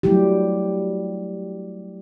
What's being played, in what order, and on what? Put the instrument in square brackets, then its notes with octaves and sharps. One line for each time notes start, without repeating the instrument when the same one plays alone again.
[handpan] F#3 G3 A3 E4 G4